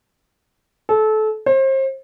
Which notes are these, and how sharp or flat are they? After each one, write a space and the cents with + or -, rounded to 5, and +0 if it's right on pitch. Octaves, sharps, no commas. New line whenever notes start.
A4 -25
C5 +35